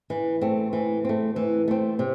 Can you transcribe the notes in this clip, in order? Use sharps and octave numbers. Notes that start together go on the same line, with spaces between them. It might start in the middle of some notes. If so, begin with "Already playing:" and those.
E3
A3 C4
E3
A3 C4
E3
A3 C4
C3